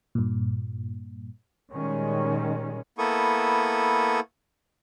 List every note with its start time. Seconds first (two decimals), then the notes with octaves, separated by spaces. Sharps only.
0.15 G2 A#2
1.71 A#2 D#3 G3 G#3 C#4
2.98 A#3 B3 E4 A4 C#6 D#6